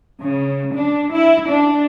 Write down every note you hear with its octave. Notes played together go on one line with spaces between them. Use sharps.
C#3
D4
E4
D4